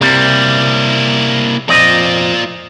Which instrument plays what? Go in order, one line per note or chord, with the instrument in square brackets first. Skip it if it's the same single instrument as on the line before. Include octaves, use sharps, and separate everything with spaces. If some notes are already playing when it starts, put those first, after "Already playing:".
[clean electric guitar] C3 G3 [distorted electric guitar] A#3 E4
[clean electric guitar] F2 C4 D#5 [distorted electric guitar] F4 D5